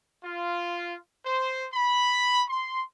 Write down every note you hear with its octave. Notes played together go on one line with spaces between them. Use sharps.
F4
C5
B5
C6